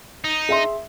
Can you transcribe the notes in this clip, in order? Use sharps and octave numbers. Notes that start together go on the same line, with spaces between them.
D#4
G#4 E5 C6